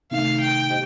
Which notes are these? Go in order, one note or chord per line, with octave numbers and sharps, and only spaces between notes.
C3 D#3 A3 D#4 F5
G5
G4 C5 D#5